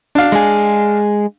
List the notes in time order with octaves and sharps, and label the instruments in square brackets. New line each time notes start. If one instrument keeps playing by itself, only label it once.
[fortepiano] D4 F5
[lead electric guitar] G#3 G#4